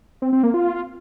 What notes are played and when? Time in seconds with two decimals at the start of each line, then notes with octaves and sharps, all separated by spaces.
0.22 C4
0.33 C4
0.43 A#3
0.54 F4